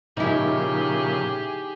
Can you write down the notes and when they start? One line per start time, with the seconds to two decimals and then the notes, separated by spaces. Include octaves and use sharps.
0.17 A#2 C#3 F3 D#4 E4 G4 G#4